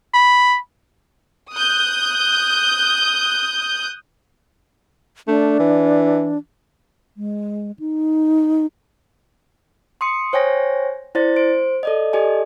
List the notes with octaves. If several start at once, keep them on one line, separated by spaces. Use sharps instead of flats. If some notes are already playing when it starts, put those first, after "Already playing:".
B5
D#6 F#6 G6
A3 D4
E3
G#3
D#4
C6 D#6 C#7
C5 C#5 G5 G#5 A#6
E4 C5 D5 A6
C5 D7
A4 D5 D#5
G4 A4 D5 D#5 G#5